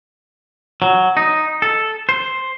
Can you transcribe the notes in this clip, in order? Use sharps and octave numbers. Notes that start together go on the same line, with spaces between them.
F#3
D#4
A4
C5